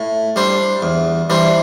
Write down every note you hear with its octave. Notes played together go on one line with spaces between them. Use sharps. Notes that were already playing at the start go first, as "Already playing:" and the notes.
Already playing: A2
G3 D4 C5
E2
E3 G3 D4 C5